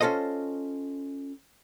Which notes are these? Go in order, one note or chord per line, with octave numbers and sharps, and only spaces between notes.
C#4 F4 A4 C5 D#5